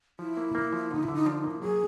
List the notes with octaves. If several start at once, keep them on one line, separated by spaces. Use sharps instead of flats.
F3 E4
A#3
A#3
F3
D3 D#4
E4
D3
D#4
F3 D4
D#4
A#3
E4
F#3 G#4